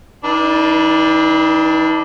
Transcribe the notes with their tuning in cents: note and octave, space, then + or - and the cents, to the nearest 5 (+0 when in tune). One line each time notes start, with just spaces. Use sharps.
D#3 +45 D4 +0 B4 -10